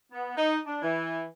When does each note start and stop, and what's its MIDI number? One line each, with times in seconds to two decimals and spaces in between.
0.12 0.33 59
0.37 0.57 63
0.67 0.81 62
0.82 1.25 52